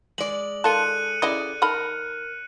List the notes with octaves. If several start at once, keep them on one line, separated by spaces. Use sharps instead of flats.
G#3 D5 F#7
D#3 F4 A4 A5 F#6 C#7 D#7
C#3 E4 D5 D#5
D#3 A4 A#4 B5 F6